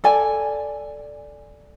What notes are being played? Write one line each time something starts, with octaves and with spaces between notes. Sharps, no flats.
A4 D5 G#5